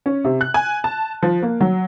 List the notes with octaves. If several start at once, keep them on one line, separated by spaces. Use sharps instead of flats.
C#4
C3
F#6
G#5
A5
F3
A#3
F#3